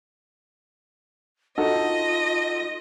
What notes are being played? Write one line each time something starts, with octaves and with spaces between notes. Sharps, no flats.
D#4 F4 F#4 A4 D#5